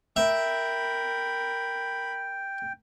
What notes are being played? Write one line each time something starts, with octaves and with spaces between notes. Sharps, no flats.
A#4 E5 G5 B5